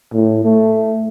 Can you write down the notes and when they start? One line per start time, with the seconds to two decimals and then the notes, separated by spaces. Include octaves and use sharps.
0.13 A2
0.45 A3